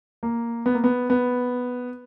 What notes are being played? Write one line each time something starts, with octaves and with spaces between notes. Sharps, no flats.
A#3
B3
A#3
B3
B3